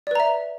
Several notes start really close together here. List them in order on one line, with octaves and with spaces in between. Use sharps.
D5 B4 A#5 E5